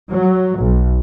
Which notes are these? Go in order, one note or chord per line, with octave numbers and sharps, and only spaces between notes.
F#3
B1